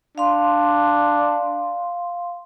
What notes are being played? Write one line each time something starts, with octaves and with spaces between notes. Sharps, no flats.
D4 F5 C6